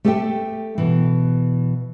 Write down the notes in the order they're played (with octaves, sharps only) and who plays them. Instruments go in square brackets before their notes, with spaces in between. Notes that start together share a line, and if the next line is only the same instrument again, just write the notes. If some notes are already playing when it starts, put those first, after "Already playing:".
[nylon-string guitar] A3 G4 A4 C5 E5 G5
B2 E3